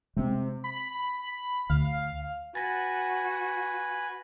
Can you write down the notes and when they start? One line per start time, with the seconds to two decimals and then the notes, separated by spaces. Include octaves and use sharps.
0.17 C3 G#3 C4
0.64 B5
1.70 D2 F5
2.55 F#4 B4 G#5 A6 A#6